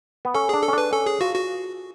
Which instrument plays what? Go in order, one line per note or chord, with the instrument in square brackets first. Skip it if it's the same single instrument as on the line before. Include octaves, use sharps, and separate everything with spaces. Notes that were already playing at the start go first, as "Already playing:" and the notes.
[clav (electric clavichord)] B3
[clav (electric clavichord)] C#4 [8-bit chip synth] A4
[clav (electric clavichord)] D4 [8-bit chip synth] G#4
[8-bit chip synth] A4
[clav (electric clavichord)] C#4
[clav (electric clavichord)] D4 [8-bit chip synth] B4
[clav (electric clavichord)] C#4 [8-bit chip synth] A4
[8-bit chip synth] G#4
[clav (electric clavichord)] F4 [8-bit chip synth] F#4
[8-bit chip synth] F#4